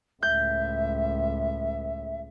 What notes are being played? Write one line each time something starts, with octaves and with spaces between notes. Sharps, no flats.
C#2 A2 E5 G6